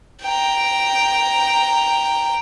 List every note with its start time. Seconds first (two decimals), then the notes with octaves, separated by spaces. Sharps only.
0.23 G5 A#5